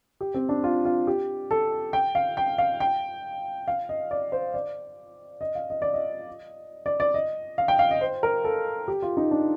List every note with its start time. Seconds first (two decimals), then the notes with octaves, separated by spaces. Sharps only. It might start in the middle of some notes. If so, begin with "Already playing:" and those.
0.21 G4
0.34 C4
0.49 D4
0.64 F4
0.85 F4
1.07 G4
1.51 A4
1.93 G5
2.15 F5
2.37 G5
2.58 F5
2.80 G5
3.68 F5
3.89 D#5
4.11 D5
4.32 C5
4.54 D5
5.41 D#5
5.55 F5
5.70 D#5
5.82 D5
5.94 D#5
6.86 D5
7.00 D5
7.14 D#5
7.58 F5
7.68 G5
7.79 F5
7.91 D#5
8.01 C5
8.23 A#4
8.44 A4
8.88 G4
9.02 F4
9.17 D#4
9.31 D4